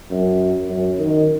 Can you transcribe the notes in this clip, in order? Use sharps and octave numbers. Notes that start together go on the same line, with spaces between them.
F#2
F#2
D#3